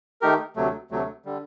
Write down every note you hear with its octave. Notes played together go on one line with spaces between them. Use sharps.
D#3 A3 D#4 G4 A#4
D2 C3 F#3 A3
D2 C3 F#3 A3
D3 G3